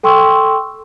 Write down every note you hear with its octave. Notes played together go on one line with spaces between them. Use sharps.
A4 G5 C6 C#6 E6